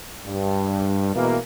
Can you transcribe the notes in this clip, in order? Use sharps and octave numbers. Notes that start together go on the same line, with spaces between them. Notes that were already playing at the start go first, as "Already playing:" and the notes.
G2
B2 E3 G#3 A#3